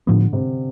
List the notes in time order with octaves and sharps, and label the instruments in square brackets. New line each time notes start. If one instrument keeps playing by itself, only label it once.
[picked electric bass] A2 F3 B3 [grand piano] D3
[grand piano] C3